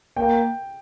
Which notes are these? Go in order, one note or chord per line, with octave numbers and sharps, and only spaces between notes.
A#3 G5